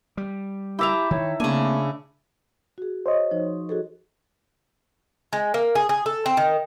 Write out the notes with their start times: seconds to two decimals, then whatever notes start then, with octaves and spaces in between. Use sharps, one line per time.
0.17 G3
0.79 E4 G4 E5 G5 A5 A#5
1.11 D#3 C#5
1.40 C#3 A3 A#3 C4 D4 G#5
2.78 F#4 G#4
3.06 C5 C#5 D#5
3.31 F3 D#4
3.69 F#4 G#4 A4
5.33 G#3
5.54 A#3
5.75 G#4
5.89 G#4
6.06 A4
6.26 C4
6.37 D#3